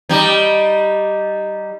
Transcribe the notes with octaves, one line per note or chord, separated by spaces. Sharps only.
G3 D#4